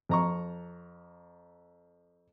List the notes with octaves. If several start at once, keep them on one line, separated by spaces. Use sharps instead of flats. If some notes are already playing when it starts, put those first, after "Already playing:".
F2 A#5 C#6